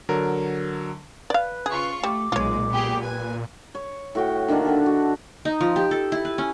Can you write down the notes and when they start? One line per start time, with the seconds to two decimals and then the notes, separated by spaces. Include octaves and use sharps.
0.09 D3 F#3 A#4
1.30 B4 D5 F5
1.66 C#3 F4 G#4 C#6
2.03 G3 A3 D6
2.32 B1 A#2 G#3 F4 C#5
2.70 B3 G4 G#4
3.02 B4 G#5
3.75 C#5
4.15 A2 F#4 G5
4.48 D3 D#3 A#3 D4
4.65 A4 E5 F#5
4.86 F#4
5.45 D#4
5.61 F3
5.76 G4
5.91 A4
6.12 E4
6.25 B4
6.38 C#4